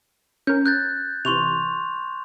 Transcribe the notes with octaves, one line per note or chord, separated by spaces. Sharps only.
C#4 A#4 G6
F#6 G6 A6
C3 E3 C6 C#6 F7